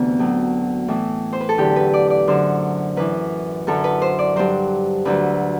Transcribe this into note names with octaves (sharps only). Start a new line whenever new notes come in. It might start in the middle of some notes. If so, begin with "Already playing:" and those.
Already playing: D2 C3 E3 A3 B3
A2 F#3
A2 E3
C5
B4
A4
E2 D3 F#3 G4
B4
D5
D5
F#2 D3 F#3 C5
F#2 E3 B4
F#2 D3 F#3 A4
B4
C5
D5
G2 F#3 C5
D2 D3 F#3 B4